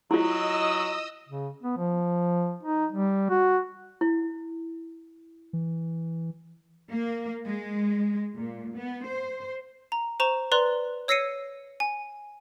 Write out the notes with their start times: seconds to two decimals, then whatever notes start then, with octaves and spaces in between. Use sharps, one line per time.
0.11 F#3 E4 F4 D#5 D#6 E6
1.29 C#3
1.63 B3
1.77 F3
2.63 D#4
2.92 G3
3.30 F#4
4.01 E4
5.53 E3
6.90 A#3
7.46 G#3
8.35 A#2
8.76 B3
9.06 C5
9.92 A#5
10.20 C5 A#5 C#6 E7
10.52 B4 D5 A#5 C6 F#6
11.08 C#5 E6 A#6 C7 C#7 D#7
11.80 G#5